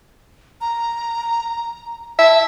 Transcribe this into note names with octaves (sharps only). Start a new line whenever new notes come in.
A#5
E5 A5